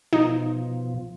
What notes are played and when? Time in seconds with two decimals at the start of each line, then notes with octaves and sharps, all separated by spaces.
0.13 B2 F3 D#4